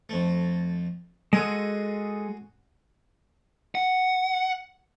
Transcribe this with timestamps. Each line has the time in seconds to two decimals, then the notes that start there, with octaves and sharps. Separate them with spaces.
0.09 F2 A3
1.33 G#3 F#4 G#4 A4 C6 D#6
3.75 F#5